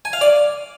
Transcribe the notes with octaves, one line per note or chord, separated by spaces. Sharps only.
G#5
F5
D5